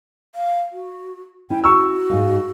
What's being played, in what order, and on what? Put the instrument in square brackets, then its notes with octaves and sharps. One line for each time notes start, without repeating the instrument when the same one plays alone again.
[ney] F5
F#4
[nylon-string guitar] C#4 E4 [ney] G5
[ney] F#4 [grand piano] C#6 E6
[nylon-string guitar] G#2 D#4 F5